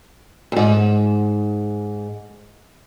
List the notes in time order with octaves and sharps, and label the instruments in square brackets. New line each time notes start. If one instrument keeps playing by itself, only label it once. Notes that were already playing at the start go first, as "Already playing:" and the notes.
[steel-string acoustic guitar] D2 G#2